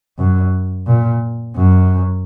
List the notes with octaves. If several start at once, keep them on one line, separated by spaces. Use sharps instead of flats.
F#2
A#2
F#2